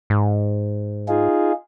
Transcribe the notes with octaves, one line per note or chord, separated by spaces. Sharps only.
G#2
D#4 F4 G#4